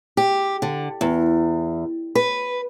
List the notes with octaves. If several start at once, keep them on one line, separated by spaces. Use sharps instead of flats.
G4
D3
E2
B4